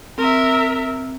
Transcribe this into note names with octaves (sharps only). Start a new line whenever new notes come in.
C4 A#4 E5